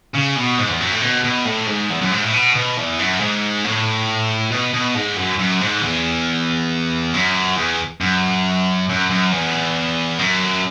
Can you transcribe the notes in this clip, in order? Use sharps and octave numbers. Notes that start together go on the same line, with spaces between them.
C#3
B2
G#2
E2
F#2
A2
B2
B2
A2
G#2
E2
F#2
G#2
A2
B2
B2
E2
F#2
G#2
A2
B2
B2
G#2
F#2
F#2
G#2
E2
F#2
E2
F#2
F#2
F#2
E2
F#2